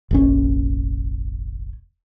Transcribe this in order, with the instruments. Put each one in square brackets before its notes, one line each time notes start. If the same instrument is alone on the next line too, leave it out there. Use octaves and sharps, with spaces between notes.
[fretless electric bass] F1 A#1 C#4